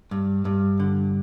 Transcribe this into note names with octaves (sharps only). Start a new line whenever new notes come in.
G2
G2
D3